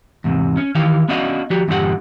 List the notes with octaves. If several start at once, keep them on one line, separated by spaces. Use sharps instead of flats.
E2 G#2 C3
C#4
D#3 E3 G4 F5
B3 C#4 D4 F#4 D#5 F5
F3 F#4 G4
E2 G2 A#2 D3 G4 F#5